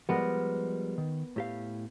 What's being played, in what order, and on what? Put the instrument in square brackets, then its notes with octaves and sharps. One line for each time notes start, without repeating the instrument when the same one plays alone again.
[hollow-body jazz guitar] F3 G3 G#3 [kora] B3 A#4
[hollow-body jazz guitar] D#3
A2 G4 F5